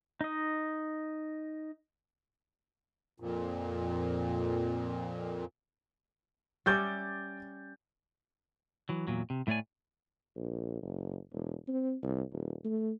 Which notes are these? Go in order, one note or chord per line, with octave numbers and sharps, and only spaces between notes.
D#4 D#5
F2 A#2
G3 C#4 E5 D6 G6 A6
E3 F#3
E2 A#2 F#3
C3
A2 A3 C#5 D5 G#5
A#1
F#1
E1
C4
C2
D#1
A3